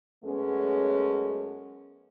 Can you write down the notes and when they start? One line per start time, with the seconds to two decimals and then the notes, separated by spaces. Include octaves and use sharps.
0.24 F#2 G#3 A3 B3 C#4